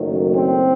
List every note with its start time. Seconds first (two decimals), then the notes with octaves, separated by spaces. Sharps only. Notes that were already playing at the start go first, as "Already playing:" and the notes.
Already playing: F#1 F#2 D#3 F#3 A3
0.34 C4